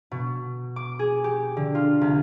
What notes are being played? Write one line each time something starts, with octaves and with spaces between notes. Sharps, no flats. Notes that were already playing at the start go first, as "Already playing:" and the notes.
B2
D6
G#4
G4
D3
F4
C2